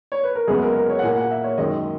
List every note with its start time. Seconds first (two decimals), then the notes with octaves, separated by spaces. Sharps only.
0.12 C#5
0.23 B4
0.35 A#4
0.48 F#2 C#3 G#3 B3 G#4
0.62 A#4
0.76 A#4
0.90 C#5
0.99 F#5
1.03 A#2 A#3 G#5
1.16 F#5
1.31 E5
1.44 C#5
1.58 F#2 D#3 G#3 D#5